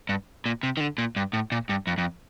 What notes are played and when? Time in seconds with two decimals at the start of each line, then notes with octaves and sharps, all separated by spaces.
0.09 G2
0.46 A#2
0.63 C3
0.77 D#3
0.80 D3
0.98 A#2
1.16 G2
1.33 A2
1.52 A#2
1.69 G2
1.87 F2
1.98 F2